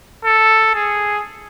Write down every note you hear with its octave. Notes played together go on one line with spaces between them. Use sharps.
A4
G#4